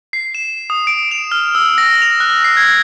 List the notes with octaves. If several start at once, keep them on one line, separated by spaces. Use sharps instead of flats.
C7
E7
D#6
D7
F7
F6
E6
A#6
F7
F#6
C7
G#6